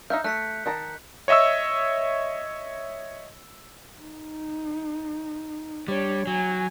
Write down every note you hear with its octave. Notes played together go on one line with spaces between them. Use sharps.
D#4 E5 F5 G6
A3 F#6 B6 C#7
D#3 A5 A#5
C#5 D#5 E5 C#6 E6
D#4
G3 D4 C#5
F#3 G#5